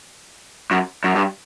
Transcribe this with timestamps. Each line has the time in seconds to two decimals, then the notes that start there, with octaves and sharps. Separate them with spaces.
0.71 F#2
1.04 F#2
1.15 G2